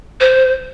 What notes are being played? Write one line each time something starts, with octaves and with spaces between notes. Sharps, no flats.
C5